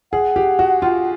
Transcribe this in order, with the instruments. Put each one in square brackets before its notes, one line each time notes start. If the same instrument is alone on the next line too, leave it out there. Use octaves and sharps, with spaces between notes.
[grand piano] G#4 [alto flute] F#5
[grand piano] G4
F#4
F4